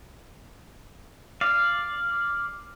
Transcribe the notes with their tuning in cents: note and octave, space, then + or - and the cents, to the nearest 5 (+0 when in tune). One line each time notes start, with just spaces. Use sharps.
D5 +0 F5 -5